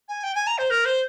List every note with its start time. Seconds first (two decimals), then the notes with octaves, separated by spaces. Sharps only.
0.09 G#5
0.24 G5
0.35 G#5
0.47 A#5
0.58 C5
0.70 A#4
0.85 C5